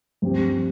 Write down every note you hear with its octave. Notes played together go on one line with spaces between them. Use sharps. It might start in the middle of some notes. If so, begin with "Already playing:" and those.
G2 F3 C4 G4